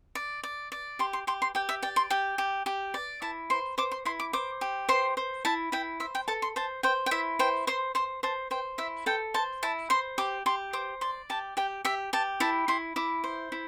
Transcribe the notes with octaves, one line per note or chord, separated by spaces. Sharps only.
D5
D5
D5
G4 C6
C6
G4 C6
C6
G4 G5
E5
D5 G5
C6
G4 G5
G4
G4
D5
E4 A5
C5 C6
C5 D6
C6
E4 C6
D6
C5 D6
G4
C5 C6
C5
E4 A5
E4 G5
C5 E5
G5
A4 A5
C6
C5 A5
C5 G5
G5
E4 E5
C5 G5
C5 C6
C5 C6
C5 A5
C5 G5
E4 E5
A4 G5
C5 A5
E4 A5
C5 C6
G4 D6
G4 C6
C5 D6
D5 C6
G4 A5
G4 G5
G4 E5
G4 A5
E4 A5
E4 C6
E4 D6
C5
E4